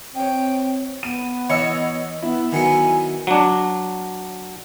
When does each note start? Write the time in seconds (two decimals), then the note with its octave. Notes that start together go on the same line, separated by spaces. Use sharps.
0.15 C4 C#5 D#5 G5
1.03 B3 D#7
1.50 E3 C#5 D#5 C#6 E6
2.22 B3 E4
2.52 D#3 F#3 B3 G#5
3.27 F#3 D4